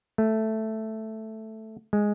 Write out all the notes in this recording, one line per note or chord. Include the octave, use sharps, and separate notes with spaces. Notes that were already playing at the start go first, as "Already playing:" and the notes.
A3
G#3